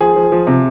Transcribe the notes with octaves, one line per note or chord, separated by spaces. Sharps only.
F3 G#4
F3
F3
C3